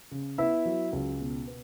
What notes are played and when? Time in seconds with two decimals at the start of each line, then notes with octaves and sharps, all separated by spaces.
0.11 C#3
0.38 B3 E4 E5
0.65 F#3
0.93 C#2
1.20 B2
1.47 B3